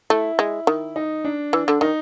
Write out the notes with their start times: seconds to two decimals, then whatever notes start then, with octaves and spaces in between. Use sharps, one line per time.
0.10 A3 E4
0.39 G#3
0.67 D#3
0.96 D#4
1.24 D4
1.53 E3
1.68 D3
1.81 D#3 D#4